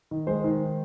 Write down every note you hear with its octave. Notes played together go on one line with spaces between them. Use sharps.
D#3
G#3 C5
D#3